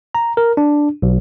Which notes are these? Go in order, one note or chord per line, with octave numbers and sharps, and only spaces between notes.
A#5
A#4
D4
B1